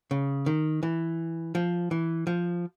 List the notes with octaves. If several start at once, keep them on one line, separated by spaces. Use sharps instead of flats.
C#3
D#3
E3
F3
E3
F3